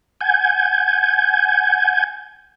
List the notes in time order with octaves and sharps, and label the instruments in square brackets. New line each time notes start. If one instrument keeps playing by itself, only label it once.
[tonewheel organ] F#5 G#5 G6 G#6